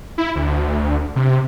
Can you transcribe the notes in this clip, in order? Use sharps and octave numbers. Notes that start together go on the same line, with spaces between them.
E4
D2
C3